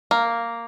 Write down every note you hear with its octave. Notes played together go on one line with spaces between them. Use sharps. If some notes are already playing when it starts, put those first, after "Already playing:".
A#3